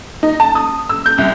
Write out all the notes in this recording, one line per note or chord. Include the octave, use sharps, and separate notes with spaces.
D#4
A5
D#6
E6
G6
C2